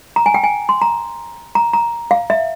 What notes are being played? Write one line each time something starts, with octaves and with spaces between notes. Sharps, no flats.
A#5
G#5
G5
G#5
C6
A#5
A#5
A#5
F5
E5